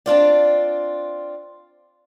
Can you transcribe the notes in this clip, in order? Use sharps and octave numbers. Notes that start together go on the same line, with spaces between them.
C4 D4 F4 D5